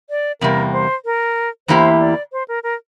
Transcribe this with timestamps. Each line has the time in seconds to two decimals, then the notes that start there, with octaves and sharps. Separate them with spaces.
0.10 D5
0.41 E2 C3 G3 A#3 A#4
0.73 C5
1.05 A#4
1.68 E2 E3 A#3 E4 G4 C5
2.00 D5
2.32 C5
2.48 A#4
2.63 A#4